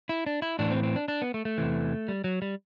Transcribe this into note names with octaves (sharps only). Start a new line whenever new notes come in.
E4
D4
E4
A2 E3 D4
C4
C4
D4
D4
B3
A3
A3
E2 C3 E3
G3
F#3
G3